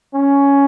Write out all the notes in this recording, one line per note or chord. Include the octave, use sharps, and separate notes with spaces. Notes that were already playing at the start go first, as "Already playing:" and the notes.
C#4